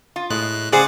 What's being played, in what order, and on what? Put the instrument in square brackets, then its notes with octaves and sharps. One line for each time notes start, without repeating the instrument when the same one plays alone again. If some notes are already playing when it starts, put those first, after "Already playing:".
[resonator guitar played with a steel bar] F4
[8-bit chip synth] A2 F#6 [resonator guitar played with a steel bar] G#3
[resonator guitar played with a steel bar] C#3 G#4 C5 [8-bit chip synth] D5 F#5 D6